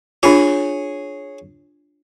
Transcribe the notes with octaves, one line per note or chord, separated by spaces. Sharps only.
D4 F4 G#4 C#5